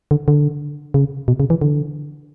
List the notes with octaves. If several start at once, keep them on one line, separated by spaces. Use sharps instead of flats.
D3
D3
C#3
B2
C#3
E3
D3